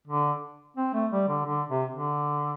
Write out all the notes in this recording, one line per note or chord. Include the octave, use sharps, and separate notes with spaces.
D3
C4
A3
G3
D3
D3
C3
D3